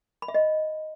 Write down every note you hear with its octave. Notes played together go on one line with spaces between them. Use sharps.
B5
E5
D#5